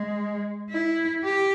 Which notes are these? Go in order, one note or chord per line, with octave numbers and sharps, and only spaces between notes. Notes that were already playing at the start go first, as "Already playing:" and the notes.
Already playing: G#3
E4
G4